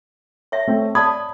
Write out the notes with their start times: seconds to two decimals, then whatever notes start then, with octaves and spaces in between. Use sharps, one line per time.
0.52 C#5 E5
0.68 A3 C4
0.95 D5 A5 B5 D#6 G#6